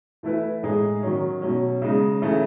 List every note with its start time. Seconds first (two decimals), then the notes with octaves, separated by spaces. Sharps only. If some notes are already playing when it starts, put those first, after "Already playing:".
0.23 E3 A3 E4 B4
0.63 A2 G#3 D#4 G#4
1.03 D#3 F#3 C#4
1.42 B2 F#3 C#4
1.82 C#3 G#3 D#4
2.22 C#3 E3 A3